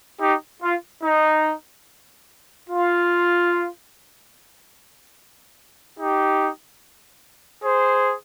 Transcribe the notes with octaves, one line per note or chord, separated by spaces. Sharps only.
D#4 G4
F4
D#4
F4
D#4 G4
G#4 C5